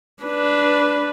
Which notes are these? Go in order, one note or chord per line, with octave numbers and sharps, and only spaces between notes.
D4 B4